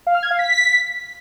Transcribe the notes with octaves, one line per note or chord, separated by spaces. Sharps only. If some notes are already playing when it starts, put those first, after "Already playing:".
F5
F6
G#6
F5
B6